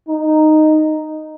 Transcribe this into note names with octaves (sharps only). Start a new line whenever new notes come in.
D#4